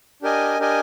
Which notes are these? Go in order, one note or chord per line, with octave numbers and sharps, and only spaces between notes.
D4 G4 A#4 D#5 G#5
D4 G4 A#4 D#5 G#5